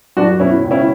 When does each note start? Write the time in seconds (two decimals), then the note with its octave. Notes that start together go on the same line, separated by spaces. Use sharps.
0.17 F#2 D4 F#4
0.40 B2 C#4 E4
0.64 C#2
0.71 C#4 E4